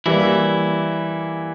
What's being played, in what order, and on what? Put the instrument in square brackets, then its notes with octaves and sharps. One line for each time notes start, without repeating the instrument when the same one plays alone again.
[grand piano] E3 G3 A#3 [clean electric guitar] E4